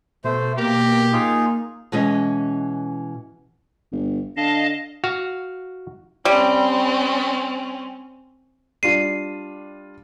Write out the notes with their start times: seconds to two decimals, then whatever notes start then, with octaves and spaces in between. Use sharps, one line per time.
0.24 B2 A3 C5
0.57 A#3 G4 A#5
1.13 D#4 F4 G#4
1.92 B2 E3 G#3 C#4 D#5
3.92 G1
4.36 D3 D#5 F5 A5
5.04 F#4 F5
6.25 G3 C4 C#4
8.83 G3 D4 F4 C7 D#7